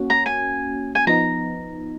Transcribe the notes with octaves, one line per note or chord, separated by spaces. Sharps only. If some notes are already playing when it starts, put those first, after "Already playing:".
Already playing: A#3 C#4 F#4
A#5
G#5
G#5
F3 B3 D#4 A#5